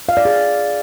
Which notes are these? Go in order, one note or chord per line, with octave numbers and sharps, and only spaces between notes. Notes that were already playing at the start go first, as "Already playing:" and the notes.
F5
D5
G#4